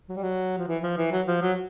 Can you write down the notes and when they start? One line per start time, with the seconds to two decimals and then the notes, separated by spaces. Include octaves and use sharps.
0.09 F#3
0.16 G3
0.23 F#3
0.58 F3
0.67 E3
0.83 F3
0.98 E3
1.11 F#3
1.27 F3
1.42 F#3